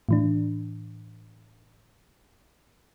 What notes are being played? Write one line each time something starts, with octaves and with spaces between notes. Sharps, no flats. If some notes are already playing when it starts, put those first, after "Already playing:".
A2 E3 D4